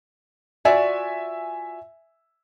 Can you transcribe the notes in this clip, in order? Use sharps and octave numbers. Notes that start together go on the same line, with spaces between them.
F4 F#4 D5 E5 G#5